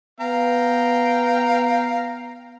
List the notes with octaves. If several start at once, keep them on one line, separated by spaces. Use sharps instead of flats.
B3 F5 G5 A#5